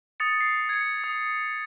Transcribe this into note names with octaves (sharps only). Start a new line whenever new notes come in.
D#6 A6 C#7
C7
G#6 C#7
D#6